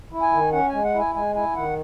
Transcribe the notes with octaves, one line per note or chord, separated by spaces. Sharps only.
E4
G#5
D#3
C#4 F#5
G#3 G#5
F#5
E4 G#5
G#3 G#5
E4 G#5
D#3 F#5